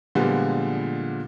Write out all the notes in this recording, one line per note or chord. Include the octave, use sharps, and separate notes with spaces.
A#2 D3 F3 G3 G#3 B3